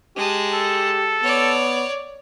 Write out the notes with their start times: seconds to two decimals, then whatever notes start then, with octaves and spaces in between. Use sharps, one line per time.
0.17 G#3 G4 A5
0.54 A4
1.23 B3 C#5 D5